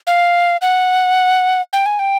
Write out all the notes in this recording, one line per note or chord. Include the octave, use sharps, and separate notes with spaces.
F5
F#5
G5
G#5
G5